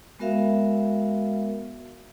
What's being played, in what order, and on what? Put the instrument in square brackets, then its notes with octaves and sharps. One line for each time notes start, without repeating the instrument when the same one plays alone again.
[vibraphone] G#3 B3 F#4 A#4 E5 F5